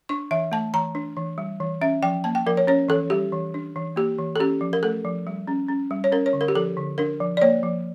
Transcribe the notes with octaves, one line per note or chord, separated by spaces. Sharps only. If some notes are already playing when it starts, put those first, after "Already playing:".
D4 C#6
E3 E5
A3 A5
E3 A#5
D4
E3
G3
E3
C#4 E5
F3 G5
A#3 A5
G5
F3 A#4
C#5
C#4 C#5
E3 A4
G3 G4
E3
D4
E3
A#3 G4
E3
A4
C#4 G4
F3
A#4
A3 A4
F3
G3
C#4
C#4
G3
C#5
C#4 A#4
C#5
D3
A#4
G4
F3 A4
D3
D4 A#4
F3
D5
A#3 C#5
F3